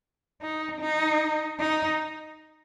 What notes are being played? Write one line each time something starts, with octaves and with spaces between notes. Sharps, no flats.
D#4
D#4
D#4